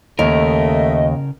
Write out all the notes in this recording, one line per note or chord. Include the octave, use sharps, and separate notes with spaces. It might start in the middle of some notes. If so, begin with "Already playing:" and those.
D#2 C#3 A3 A#4 D#5